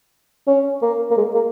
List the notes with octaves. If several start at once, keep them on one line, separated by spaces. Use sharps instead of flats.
C#4
A#3
A#3
G#3
A#3